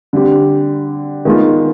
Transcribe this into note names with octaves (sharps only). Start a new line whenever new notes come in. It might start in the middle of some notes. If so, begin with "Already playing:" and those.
D3 G3 C4 G4
D#3 G#3 B3 F4